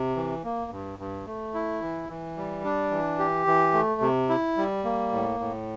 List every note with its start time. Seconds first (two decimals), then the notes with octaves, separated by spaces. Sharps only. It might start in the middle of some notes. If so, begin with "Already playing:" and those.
Already playing: C3
0.16 E3
0.44 A#3
0.72 G2
0.99 G2
1.26 A3
1.54 E4
1.81 E3
2.09 E3
2.37 G3
2.64 D4
2.91 E3
3.19 G4
3.47 E3
3.74 A3
4.01 C3
4.29 E4
4.57 G3
4.84 A#3
5.12 A2
5.40 A2